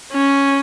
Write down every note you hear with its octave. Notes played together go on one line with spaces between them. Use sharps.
C#4